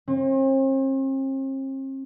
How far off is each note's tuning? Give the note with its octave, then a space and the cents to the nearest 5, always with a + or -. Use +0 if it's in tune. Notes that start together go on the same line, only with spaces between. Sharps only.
C4 +45